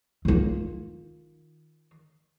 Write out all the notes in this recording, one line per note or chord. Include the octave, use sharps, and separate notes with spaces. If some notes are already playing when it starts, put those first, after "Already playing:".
D#3 F4